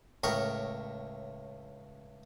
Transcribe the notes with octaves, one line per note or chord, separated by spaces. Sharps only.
C#2 A2 A#4 G5 C#6 D#6